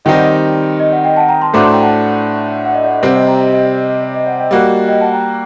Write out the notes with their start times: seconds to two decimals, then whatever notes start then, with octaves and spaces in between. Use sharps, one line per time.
0.05 D#3 G3 C4 D#4 G4 D#5 G5
0.14 D5 F#5
0.24 D#5
0.33 D5
0.79 D#5
0.92 D5 F#5
1.04 D#5 G5
1.17 F#5 A5
1.29 G5 A#5
1.42 A5 C6
1.53 A2 A3 D4 F#4 C5 A#5 D6
1.63 A5 C6
1.72 G5 A#5
1.82 F#5 A5
2.66 D5 F#5
2.75 D#5
2.84 D5 F#5
2.93 D#5
3.02 C3 G3 C4 D5 F#5
3.15 D#5 G5
3.27 G5 A#5
3.39 D#5
3.53 D#5
3.65 D5
3.77 D#5
3.89 D#5
4.02 D5
4.14 D#5
4.26 D5 F#5
4.39 D#5 G5
4.51 G3 A#3 F#4
4.88 D#5 G5
5.01 F#5 A5
5.13 G5 A#5